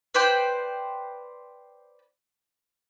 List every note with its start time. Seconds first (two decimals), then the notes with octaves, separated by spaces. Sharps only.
0.14 B4 C5 D5 G5